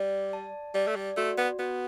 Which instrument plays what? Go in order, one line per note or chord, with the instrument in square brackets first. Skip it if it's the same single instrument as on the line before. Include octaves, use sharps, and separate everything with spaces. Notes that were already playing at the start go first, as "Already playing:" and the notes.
Already playing: [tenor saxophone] G3 [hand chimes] D5
[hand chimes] A5
[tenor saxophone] G3 [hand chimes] D5
[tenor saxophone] A3
G3
[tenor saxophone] A3 [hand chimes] F#4
[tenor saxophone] B3
[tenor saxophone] B3 [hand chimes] F#4